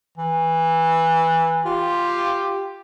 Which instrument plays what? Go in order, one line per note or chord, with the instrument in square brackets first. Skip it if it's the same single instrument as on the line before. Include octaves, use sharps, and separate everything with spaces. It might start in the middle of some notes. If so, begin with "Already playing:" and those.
[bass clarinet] E3
[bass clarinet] F4 [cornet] G4